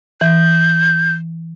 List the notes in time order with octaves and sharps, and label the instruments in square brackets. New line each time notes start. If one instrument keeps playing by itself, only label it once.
[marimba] E3 [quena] G6